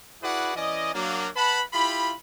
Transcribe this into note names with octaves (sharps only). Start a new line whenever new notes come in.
E4 F#4 G#4 B4 D5 F#5
E3 C#4 D5 D#5
F#3 A#3 D4
B4 F#5 A5 B5
E4 F4 G4 B5